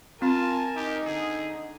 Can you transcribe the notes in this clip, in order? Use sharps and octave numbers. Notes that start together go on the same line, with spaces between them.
C4 F4 A#4 G#5 A5
D#4 G4
D3 G#4